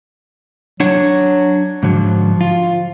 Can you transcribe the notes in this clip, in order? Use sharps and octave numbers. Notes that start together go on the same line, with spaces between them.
F#3 D4 C#5 F#5
G#2 D3 F3 F#3
F4